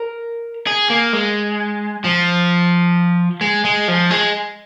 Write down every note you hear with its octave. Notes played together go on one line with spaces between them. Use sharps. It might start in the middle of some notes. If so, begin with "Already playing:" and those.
Already playing: A#4
G#4
A#3
G#3
F3
G#3
G#3
F3
G#3